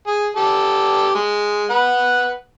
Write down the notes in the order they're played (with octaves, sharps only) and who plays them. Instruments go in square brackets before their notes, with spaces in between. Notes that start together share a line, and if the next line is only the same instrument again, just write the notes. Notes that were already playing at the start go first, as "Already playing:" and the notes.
[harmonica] G#4
G4 A4
G#3
B4 F#5